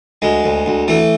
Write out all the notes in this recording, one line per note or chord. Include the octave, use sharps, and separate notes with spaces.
D2 G#3
D2
D2
E3 A3